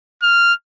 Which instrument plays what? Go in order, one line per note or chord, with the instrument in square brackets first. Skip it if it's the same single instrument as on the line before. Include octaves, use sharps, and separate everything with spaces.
[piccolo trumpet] F6